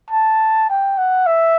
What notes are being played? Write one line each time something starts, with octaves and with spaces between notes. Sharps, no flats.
A5
G5
F#5
E5